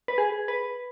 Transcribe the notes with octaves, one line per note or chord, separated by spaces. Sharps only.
B4
G#4
B4